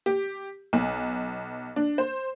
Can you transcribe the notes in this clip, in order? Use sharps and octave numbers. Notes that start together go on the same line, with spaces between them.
G4
B1
D4
C5